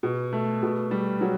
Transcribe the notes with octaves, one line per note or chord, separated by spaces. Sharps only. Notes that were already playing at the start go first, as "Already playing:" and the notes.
B2
A3
B2
G3
F#3